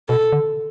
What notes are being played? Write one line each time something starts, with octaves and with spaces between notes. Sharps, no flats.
B2 A4
D3